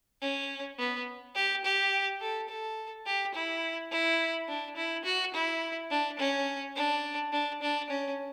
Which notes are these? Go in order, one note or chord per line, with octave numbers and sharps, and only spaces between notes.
C#4
B3
G4
G4
A4
A4
G4
E4
E4
D4
E4
F#4
E4
D4
C#4
D4
D4
D4
C#4